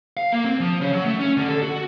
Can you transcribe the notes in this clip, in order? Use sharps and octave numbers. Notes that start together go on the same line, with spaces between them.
F5
A#3
C4
F3
C#3
F#3
A3
C#4
D3
A4
F#4